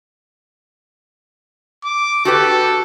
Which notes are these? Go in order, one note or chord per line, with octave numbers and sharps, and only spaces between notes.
D6
F#4 G4 A4 B4